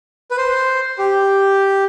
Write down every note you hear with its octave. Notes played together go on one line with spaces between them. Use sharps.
B4
C5
G4